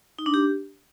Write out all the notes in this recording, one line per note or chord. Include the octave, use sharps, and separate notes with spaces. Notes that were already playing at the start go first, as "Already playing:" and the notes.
D#4
D4
G4